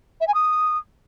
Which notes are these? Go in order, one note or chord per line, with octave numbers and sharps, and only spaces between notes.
E5
G#5
D#6